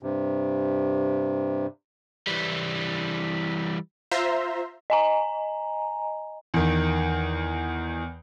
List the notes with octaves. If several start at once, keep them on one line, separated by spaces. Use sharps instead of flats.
G2 C3
E3 G3
F4 C5 E5 A#5 C6
D#5 G#5 A#5
E2 D#3